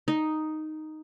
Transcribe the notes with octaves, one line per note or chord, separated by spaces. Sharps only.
D#4